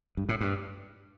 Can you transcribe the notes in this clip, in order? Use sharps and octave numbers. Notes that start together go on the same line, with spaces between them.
G2
A2
G2